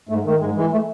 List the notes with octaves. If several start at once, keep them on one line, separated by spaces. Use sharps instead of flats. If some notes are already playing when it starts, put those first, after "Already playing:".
G#2 A3
D#3 A3
G#2 G#3
E3 G#3
A3